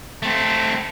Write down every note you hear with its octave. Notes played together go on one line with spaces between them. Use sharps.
A3 C4